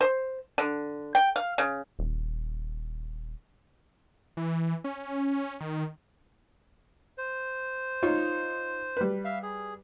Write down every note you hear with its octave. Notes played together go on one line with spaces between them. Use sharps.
C5
D3
G5
F5
C#3
D#1
E3
C#4
D#3
C5
D#4 F4 C#5
G3 B4
E5 F5
G#4